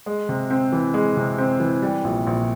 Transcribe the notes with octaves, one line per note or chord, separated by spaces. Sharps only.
G#3
C3
C4
E3
G#3
C3
C4
E3
G3
A#1
A#1